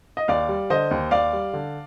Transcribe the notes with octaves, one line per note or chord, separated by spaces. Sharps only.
D#5
D#2 D5 F5
G3
D3 C5 D#5
D#2
D#2 D5 F5
G3
D3